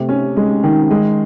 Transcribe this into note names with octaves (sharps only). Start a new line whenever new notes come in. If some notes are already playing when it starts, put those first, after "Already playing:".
Already playing: C3 A3
C#4
G#3
D#3
G#3